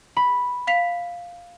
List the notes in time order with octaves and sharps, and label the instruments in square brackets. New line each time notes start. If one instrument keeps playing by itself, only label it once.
[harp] B5
[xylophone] F5 B6 F7